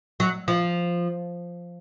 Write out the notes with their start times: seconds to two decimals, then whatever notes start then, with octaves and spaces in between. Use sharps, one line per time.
0.20 F#3
0.48 F3